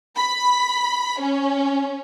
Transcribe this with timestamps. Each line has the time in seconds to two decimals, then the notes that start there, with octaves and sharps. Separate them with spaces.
0.16 B5
1.21 C#4